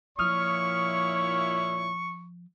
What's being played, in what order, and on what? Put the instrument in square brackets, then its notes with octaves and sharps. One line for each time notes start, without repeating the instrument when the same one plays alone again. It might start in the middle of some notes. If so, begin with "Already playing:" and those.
[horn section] A#2 E4 C#5 [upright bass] F3 [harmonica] C#6 [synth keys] D#6 F6